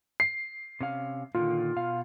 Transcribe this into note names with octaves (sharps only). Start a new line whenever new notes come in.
C7
C3 C#4 F5
A#2 D3 D#3 F4
B2 F5